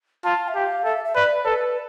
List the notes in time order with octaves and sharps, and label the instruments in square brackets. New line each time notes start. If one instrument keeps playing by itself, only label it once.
[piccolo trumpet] F4 [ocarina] A5
[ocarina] E5
[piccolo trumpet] G4 [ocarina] F5
[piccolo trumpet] A4 [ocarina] E5
[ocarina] E5
[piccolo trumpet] B4 [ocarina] D5
[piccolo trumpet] A4 [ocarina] B4